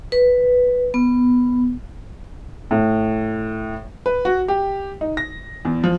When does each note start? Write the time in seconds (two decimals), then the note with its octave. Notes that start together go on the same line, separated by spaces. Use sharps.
0.12 B4
0.94 B3
2.71 A2
4.06 B4
4.25 F#4
4.48 G4
5.01 D#4
5.17 A#6
5.65 E2
5.84 F3